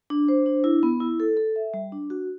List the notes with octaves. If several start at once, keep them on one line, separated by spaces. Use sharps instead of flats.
D4
C5
D4
E4
B3
E4
A4
A4
E5
G3
D4
F#4